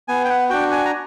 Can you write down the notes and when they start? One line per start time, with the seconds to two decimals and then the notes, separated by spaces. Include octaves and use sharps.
0.08 B3 G#5
0.25 G5
0.30 F#5
0.50 D4 F#4 G5
0.72 G#5
0.85 A#5